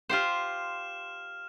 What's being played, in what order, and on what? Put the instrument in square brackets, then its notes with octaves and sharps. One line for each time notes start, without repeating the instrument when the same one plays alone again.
[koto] F4 G4 C5 [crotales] F6 E7